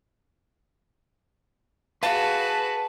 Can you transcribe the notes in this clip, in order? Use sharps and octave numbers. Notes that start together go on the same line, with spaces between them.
F#4 G#4 B4 F5 A5